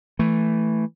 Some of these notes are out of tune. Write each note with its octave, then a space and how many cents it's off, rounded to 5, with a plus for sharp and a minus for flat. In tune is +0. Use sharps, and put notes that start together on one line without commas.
E3 +0 A3 +0